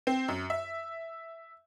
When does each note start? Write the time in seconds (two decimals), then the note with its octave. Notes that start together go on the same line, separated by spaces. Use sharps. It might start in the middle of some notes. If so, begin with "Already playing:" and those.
0.07 C4
0.28 F#2
0.50 E5